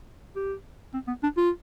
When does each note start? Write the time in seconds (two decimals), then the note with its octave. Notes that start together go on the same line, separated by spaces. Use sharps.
0.36 G4
0.94 C4
1.08 B3
1.23 D4
1.37 F4